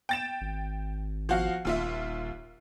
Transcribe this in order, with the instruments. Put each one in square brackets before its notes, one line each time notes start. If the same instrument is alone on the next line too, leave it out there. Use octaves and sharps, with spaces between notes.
[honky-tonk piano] G5 A6 E7
[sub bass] G#1
[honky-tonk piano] F3 F#4 F5
[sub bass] D#1 [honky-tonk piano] D#2 F4 E5